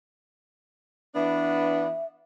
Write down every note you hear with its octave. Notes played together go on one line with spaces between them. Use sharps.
E3 B3 D4 E5